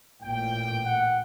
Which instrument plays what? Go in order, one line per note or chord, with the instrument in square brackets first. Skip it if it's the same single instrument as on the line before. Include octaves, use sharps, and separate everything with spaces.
[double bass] A1 A#2 [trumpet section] G5
[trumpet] F#5